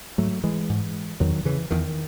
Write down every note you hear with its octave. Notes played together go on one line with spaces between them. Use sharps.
G#2 F#3 A3
E3 G#3
G#2
E2 D#3 F#3
C#3 E3
E2 D#3